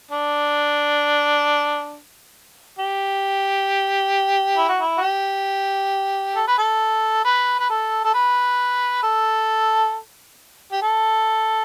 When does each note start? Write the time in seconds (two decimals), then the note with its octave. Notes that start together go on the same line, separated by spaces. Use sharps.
0.11 D4
2.79 G4
4.57 E4
4.69 F#4
4.80 E4
4.98 F#4
5.01 G4
6.35 A4
6.47 B4
6.58 A4
7.25 B4
7.59 B4
7.70 A4
8.05 A4
8.14 B4
9.03 A4
10.72 G4
10.82 A4